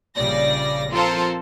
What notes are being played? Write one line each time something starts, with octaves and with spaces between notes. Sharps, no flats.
A#1 C#3 G3 D5 A#6
F3 C4 F4 A4 A#4 C5